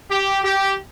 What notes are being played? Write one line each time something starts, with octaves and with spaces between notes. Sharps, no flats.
G4
G4